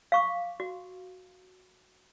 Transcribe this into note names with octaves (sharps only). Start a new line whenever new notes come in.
F5 C#6 D6
F#4